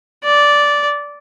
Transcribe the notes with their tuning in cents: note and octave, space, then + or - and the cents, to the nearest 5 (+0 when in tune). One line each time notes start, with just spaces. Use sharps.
D5 -10